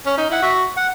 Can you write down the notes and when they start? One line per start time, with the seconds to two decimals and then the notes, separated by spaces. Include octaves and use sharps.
0.06 C#4
0.17 D#4
0.30 E4 F#5
0.42 F#4 E5
0.77 F#5